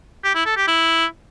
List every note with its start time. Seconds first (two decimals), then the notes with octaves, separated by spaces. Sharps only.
0.24 G4
0.35 E4
0.46 A4
0.57 G4
0.68 E4